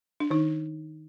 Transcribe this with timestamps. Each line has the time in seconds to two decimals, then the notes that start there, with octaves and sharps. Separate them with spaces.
0.20 D4
0.30 D#3 D#4